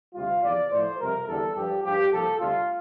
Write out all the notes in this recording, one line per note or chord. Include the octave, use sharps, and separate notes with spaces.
D2 C3 G3 F4
E2 C3 F3 D5
A2 F3 C5
F2 C3 G3 A#4
E2 D3 G3 A4
G2 F3 G4
G2 F3 G4
C2 A#2 F3 A4
D2 C3 G3 F4